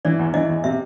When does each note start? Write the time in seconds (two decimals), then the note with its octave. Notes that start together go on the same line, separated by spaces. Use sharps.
0.05 E3 D5
0.19 E2
0.34 E3 D#5
0.49 E2
0.64 C3 E5